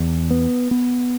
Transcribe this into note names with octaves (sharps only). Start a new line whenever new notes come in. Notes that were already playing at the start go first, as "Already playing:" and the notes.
Already playing: E2
B3
B3